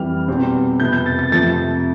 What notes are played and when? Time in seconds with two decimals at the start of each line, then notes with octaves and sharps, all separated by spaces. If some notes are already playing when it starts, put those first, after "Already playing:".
Already playing: F2 E3 G3 F6
0.28 E2 B2 G3 C4
0.80 F2 C3 F3 B3 G6
0.93 G6
1.06 A6
1.19 A6
1.32 F2 C3 F3 A3 A6